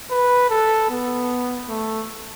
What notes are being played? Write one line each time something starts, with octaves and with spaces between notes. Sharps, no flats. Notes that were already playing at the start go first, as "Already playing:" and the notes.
B4
A4
B3
A3